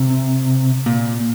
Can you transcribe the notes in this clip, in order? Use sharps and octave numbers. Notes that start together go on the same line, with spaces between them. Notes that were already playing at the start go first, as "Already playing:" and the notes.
Already playing: C3
A#2